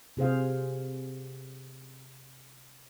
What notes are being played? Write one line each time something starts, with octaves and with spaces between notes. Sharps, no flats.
C3 G#4 C5 F5